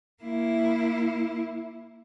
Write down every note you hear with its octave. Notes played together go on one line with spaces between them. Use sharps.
A#3 E4